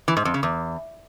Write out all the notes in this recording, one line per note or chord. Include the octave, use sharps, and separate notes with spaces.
E3
G#2
F2
C#3
E2